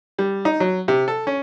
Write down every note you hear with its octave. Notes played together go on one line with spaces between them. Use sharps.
G3
D#4
F#3
C3
A4
C#4